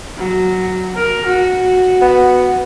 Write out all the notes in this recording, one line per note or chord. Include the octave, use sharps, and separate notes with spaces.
F#3
A#4
F#4
B3